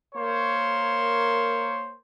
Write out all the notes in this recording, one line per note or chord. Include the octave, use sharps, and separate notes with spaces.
A#3 A#4 C5 C#5